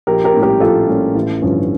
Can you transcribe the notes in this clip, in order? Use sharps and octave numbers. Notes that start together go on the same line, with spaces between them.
A#1 G4 A#4
G4 A#4
A2 G3 A#3 C#4
G4 A#4
A#1 F4 A4
A2 G3 A#3 C#4
A1
G2 D3 F3 C#4